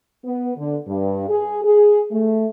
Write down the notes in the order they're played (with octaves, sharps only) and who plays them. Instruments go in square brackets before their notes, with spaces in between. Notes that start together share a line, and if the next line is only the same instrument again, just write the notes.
[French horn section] B3
D3
G2
G#4
G#4
A3